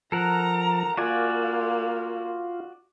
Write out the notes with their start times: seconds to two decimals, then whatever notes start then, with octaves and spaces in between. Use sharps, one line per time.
0.12 F3 A4 A#4 F#5 A#5
0.97 A#3 F4 F#4 D5 G#5